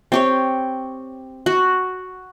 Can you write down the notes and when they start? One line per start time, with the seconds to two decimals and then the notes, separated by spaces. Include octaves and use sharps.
0.12 C4 G4 C#5
1.46 F#4